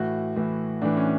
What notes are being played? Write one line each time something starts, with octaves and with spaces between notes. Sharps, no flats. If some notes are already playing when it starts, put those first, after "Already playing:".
Already playing: A2 E3 F#4
A2 E3
A2 E3 D4
C#4